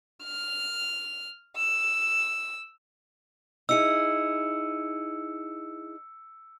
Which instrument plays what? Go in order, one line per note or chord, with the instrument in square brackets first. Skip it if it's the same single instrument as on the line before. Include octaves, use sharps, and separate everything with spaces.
[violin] F6
E6
[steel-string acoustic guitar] D#4 E4 G#4 [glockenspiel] E6 C#7